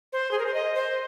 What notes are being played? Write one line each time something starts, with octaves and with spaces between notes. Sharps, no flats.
C5
G#4
A#4
C5
D#5
C5